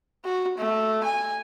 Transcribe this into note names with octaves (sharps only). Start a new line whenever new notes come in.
F#4
A3
G#5